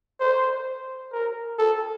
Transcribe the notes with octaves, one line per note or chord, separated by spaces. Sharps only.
C5
A#4
A4